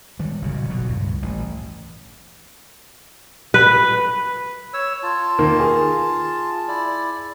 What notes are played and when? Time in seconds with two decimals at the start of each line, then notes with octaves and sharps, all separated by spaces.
0.19 D#3 G3 G#3
0.42 F#1 A#2 C#3
0.70 B2 F#3
0.88 C#2 G2
1.22 A1
3.54 B4
4.74 C#5 E6
5.03 F4 A5
5.39 D#3 A#3
5.60 G#4
6.68 E4 D5